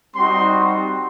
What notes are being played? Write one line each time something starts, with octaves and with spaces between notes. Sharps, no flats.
G3 C4 D#4 F#4 C6